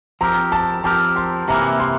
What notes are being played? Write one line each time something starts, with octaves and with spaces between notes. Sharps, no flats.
F3 C4 G4 A#4 A#5
A5
F3 C4 G4 A#4 A5
C6
C3 E3 A#3 A#5
C6